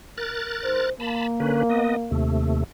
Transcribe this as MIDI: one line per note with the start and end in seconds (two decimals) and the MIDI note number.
0.18 0.90 70
0.18 0.90 90
0.18 0.90 93
0.64 0.92 44
0.64 0.92 72
1.00 2.12 58
1.00 1.27 81
1.00 1.27 83
1.40 1.63 50
1.40 1.63 61
1.40 1.63 71
1.69 1.96 59
1.69 1.96 75
2.11 2.64 39
2.11 2.64 48
2.11 2.64 57